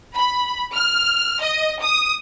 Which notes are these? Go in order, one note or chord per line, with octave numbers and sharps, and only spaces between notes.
B5
F6
D#5
D#6